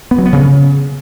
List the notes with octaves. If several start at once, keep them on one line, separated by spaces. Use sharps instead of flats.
B3
F#3
B3
C#3